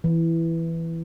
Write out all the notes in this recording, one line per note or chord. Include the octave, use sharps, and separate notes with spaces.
E3